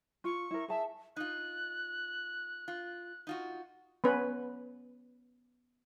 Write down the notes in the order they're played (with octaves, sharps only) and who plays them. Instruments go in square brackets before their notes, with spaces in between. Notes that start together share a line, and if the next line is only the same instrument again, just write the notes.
[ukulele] F4 [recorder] C#6
[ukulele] E4 A#4
[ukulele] G#4 A5 [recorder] E5
[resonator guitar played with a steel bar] D#4 F4 [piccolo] F#6
[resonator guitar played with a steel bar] F4
D#4 F4 F#4
[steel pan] B3 C#4 B4